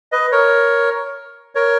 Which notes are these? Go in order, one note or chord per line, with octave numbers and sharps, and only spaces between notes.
B4 D#5
A#4 C#5
A#4 C#5